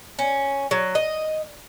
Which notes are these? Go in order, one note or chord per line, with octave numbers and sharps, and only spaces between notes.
C#4
F#3
D#5